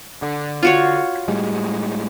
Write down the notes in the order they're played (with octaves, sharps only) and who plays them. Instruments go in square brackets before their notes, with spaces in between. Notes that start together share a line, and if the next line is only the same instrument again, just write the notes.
[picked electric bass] D3
[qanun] F4 F#4 C#5
[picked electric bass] A2 G3 G#3